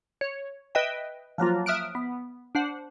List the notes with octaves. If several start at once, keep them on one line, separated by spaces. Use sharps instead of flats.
C#5
B4 D#5 E5 G5
F3 F#3 A#3 F4
E5 D#6 F6 F#6 D7
B3
D4 C5 F#5